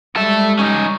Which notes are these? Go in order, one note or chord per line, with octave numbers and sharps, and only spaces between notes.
G3 G#3 A4 E5
C#4 D#4